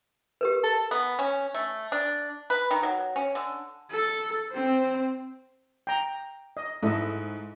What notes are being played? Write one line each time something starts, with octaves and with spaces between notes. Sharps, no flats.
G4 A#4 B4
A4
B3
C#4
A3
D4
B4
D#3
F#3
C#4
D3
A4
C4 C5
G5 A#5
D#5
G#2 E4 A4 D#5